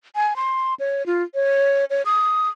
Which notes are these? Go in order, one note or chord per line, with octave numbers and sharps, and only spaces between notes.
G#5
C6
C#5
F4
C#5
C#5
D#6